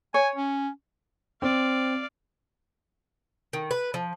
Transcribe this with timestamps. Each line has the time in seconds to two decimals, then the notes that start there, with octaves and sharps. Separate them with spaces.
0.14 C#5 G#5
0.35 C#4
1.42 C4 D5 F5
3.53 D#3
3.71 B4
3.94 F3